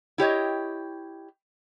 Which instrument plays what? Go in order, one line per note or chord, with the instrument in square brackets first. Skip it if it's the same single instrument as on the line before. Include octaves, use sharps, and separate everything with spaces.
[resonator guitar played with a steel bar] E4 G4 C#5 D#5